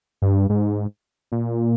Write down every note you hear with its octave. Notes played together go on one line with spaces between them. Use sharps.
G2
G#2
A#2